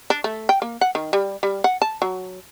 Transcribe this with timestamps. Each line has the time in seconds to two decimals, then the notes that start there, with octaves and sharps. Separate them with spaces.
0.10 D4
0.24 A3
0.49 G5
0.62 A#3
0.81 F#5
0.95 D#3
1.13 G3
1.43 G3
1.64 F#5
1.82 A5
2.02 F#3